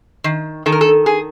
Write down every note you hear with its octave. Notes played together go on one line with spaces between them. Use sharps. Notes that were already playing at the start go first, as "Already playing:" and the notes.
D#3
D#3 A4
A#4
A4
G#4